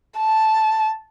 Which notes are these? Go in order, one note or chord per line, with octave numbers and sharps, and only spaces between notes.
A5